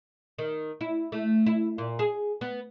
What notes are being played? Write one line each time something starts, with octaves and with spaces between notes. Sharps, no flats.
D#3
E4
A3
E4
A#2
G#4
B3